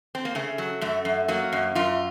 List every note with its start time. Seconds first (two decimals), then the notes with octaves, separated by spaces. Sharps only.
0.15 C4
0.25 A#3
0.35 C#3 A3
0.58 F#3
0.81 F#2 A3
1.05 F#2
1.28 F#3 A#3
1.53 F#2
1.75 F#2 F4